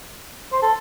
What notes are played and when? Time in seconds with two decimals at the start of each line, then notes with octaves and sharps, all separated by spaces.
0.52 C5
0.62 A4